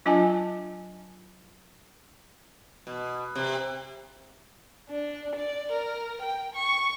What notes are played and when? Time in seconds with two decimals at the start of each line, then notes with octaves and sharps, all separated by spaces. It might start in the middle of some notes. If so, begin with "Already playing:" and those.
0.06 F#3 D4 F4 D#5 G#5 A5
2.87 B2
3.35 C3
4.90 D4
5.36 D5
5.72 A#4
6.22 G5
6.55 C#6